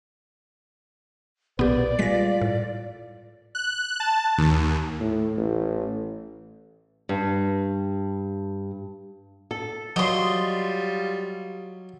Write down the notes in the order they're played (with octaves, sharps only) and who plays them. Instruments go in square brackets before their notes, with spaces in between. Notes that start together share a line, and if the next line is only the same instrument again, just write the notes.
[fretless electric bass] B1 A#2 [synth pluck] B3 G4 [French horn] B4 [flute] D5
[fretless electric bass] G3 G#3 [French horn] F4 [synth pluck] A#6 B6
[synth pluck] A2
[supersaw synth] F#6
A5
D#2
[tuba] A2
A1
[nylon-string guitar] G2
A4
[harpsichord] F#3 [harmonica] G3 F4 [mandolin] D#5 C6